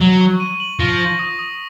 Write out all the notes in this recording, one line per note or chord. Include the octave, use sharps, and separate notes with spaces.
F#3 F#7
C#6
D#7
F#7
F3 A#6
A#6
D#6
D#6